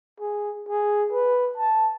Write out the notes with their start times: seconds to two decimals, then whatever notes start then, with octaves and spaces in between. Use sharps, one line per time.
0.20 G#4
0.68 G#4
1.13 B4
1.57 A5